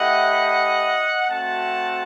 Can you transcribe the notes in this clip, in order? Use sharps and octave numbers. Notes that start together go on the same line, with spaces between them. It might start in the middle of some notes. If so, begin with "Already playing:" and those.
Already playing: A3 E4 G4 D#5 F#5
A3 C4 F#4 F#5 A5